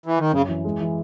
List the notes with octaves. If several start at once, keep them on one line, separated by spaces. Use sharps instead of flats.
E3
D#3
F#2 C#3
E3
G#3
E3